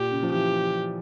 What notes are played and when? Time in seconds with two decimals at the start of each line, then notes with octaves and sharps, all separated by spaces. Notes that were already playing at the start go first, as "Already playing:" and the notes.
Already playing: A#2 G4
0.11 C#3
0.23 F3
0.32 E3 G4